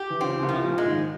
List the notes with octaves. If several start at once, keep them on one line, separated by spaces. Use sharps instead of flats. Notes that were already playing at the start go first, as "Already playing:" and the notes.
Already playing: G4
E3
C#2 C#3 C4
C#3
C2 C3
F3
A#1 A#2
A#2 G#3
G#1 G#2